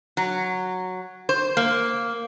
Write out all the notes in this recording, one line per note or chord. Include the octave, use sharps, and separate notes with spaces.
F#3
C5
A#3